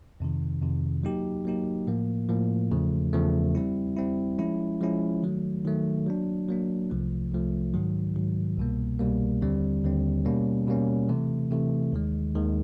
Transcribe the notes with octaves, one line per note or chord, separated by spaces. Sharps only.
F2 C3 D#3
F2 C3 D#3
F#3 A#3 D#4 G4
F#3 A#3 D#4 G4
A2 F3 A#3
A2 F3 A#3
E2 C#3 F3 A3
E2 C#3 F3 A3
G3 C4 E4
G3 C4 E4
F3 G#3 C#4 E4
F3 G#3 C#4 E4
D#3 F#3 A3
D#3 F#3 A3
F#3 A#3 D4
F#3 A#3 D4
C2 C3 F3 A3
C2 C3 F3 A3
G#2 D#3 F#3
G#2 D#3 F#3
C2 B2 G3 A#3
C2 B2 G3 A#3
D#2 D3 G3 C4
D#2 D3 G3 C4
B2 G3 A#3 C#4
B2 G3 A#3 C#4
C3 E3 A3
C3 E3 A3
D#2 D#3 G#3
D#2 D#3 G#3